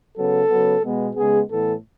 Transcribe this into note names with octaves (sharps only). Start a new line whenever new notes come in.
C#3 F#3 B3 A4
C#3 F#3 B3
B2 G#3 B3
C#3 G#3 B3 G#4
A2 E3 B3 A4